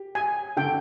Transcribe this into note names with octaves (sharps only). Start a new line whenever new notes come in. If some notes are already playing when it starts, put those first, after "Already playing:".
Already playing: G4
G4 G#5
D3 G5